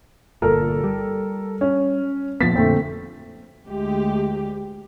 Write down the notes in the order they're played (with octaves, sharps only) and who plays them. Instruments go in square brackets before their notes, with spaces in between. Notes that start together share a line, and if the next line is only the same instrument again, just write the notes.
[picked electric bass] G1 A#2 [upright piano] A4 A#4
[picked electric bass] G3
[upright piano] C#4
[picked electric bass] A#2 F3 B3 [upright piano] A6 B6
[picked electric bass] F2 A#2 D3 [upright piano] A3 C4
[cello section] D2 G#3 G4